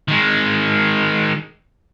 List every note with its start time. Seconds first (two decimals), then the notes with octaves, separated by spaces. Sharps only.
0.08 D#3 G#3